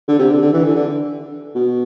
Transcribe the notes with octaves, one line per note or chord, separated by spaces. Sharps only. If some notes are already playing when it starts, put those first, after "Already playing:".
D3
C3
D3
D3
E3
D3
D3
B2